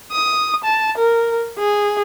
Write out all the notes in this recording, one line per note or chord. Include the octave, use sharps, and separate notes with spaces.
D#6
A5
A#4
G#4